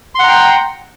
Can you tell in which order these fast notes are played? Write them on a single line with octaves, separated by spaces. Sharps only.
C6 F#5 A#5 G5